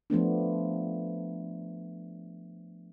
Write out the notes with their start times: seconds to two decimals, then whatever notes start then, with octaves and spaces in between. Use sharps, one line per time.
0.10 F3 A3 B3 D4